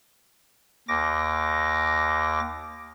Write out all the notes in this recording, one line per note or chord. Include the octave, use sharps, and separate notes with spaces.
D#2 D6 A#6